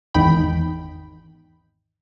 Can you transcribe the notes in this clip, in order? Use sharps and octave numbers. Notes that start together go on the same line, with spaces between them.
G#1 E2 D#4 G5 B5